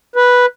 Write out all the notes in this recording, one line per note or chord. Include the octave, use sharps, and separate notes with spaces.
B4